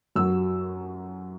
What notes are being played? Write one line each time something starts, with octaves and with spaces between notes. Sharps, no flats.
F#2 F#3 E6